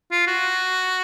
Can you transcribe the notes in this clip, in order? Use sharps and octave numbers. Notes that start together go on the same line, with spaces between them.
F4
F#4